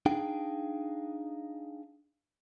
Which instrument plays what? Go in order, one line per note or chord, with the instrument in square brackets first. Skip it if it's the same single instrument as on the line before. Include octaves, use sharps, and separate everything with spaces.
[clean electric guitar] D4 D#4 G#4 F5 G5